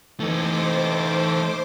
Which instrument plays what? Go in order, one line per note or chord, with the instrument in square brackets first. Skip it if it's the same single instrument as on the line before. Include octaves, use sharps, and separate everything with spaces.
[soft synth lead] E3 [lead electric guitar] A3 D#4 [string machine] C5 D6